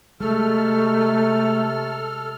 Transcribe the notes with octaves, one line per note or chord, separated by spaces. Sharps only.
C3 G#3 A3 A4 F6